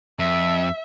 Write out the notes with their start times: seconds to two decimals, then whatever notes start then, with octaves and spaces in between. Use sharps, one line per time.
0.19 F2 E5